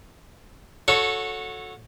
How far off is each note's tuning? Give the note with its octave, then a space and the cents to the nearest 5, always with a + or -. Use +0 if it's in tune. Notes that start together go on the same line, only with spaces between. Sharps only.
F#4 -20 A4 -5 C#5 +0